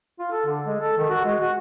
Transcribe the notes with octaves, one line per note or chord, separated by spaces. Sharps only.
F4
A4
D3
G#3
A4
D#3
F#4
G#3
F#4